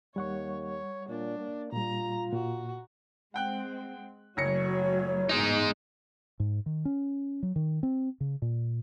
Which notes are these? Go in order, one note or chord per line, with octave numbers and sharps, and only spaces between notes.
D#2 G3 C#5 F#5 C#6
C#5
A#2 D4
A#3
A#2 G3 F4 A#5
A#2 F#4
G#3 C4 F#5 G5 F#6
F#1 F#3 A3 F#4 C#5 A#6 C#7
E2 G#2 G#3 D#4
G#2
D#3
C#4
F#3
D#3
C4
C#3
A#2